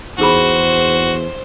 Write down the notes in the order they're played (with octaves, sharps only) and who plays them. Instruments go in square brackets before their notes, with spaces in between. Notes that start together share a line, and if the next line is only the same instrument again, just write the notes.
[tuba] E2 [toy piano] D#4 G#4 B5 [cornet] F#4 [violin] C5